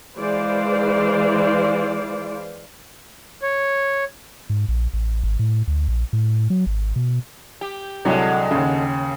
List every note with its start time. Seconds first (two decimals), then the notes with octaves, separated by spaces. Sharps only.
0.18 E3 G#3 B4 C5 D5 F5
3.43 C#5
4.50 G#2
4.68 A#1
4.93 A1
5.24 G#1
5.39 A2
5.68 D2
5.88 A#1
6.13 A2
6.50 F#3
6.66 G#1
6.96 B2
7.61 G4
8.05 C2 D3 F#3 G#3 C#5
8.51 D#2 C#3